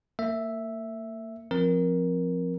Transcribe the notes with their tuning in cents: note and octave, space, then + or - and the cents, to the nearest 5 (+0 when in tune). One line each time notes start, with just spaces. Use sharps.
A#3 -35 E5 +0
F3 +0 C4 +10 A#4 +10